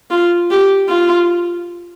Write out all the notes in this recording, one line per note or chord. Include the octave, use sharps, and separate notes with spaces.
F4
G4
F4